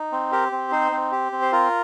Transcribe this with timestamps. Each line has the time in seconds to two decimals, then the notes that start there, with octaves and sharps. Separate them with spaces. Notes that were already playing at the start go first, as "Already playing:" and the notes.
Already playing: D#4
0.12 C4
0.32 G4 A#4
0.52 C4
0.72 D#4 C5
0.92 C4
1.12 G4
1.32 C4
1.42 C5
1.52 F4 A#4